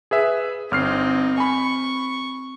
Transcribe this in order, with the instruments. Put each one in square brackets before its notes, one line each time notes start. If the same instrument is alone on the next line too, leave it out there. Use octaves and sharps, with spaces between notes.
[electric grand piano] G#4 B4 E5
[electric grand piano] G1 F6 C7 [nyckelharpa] C4 D#4
[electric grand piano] G#5 B5 [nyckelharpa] C#6